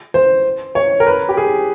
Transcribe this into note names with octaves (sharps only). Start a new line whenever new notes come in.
C5
C#5
A#4
B4
G4
G#4